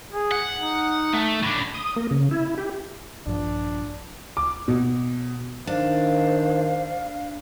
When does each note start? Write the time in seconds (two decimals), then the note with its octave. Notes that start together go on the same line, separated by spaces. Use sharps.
0.12 G#4
0.32 F#5
0.59 D#4
1.13 A3
1.43 A2 D4
1.74 D#6
1.96 A#3
2.11 C#3
2.31 E4
2.58 G4
3.26 A#1 G2 F3 D4
4.37 D6
4.68 B2
5.67 D#3 D4 C5 F5